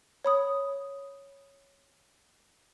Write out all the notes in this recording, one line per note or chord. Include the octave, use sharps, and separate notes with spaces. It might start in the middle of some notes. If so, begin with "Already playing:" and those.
C#5 B5 D#6